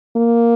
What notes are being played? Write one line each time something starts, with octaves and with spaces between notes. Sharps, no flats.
A#3